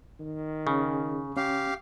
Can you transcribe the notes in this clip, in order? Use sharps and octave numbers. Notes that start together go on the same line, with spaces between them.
D#3
C#3 C#4 G#4
C#4 G4 F5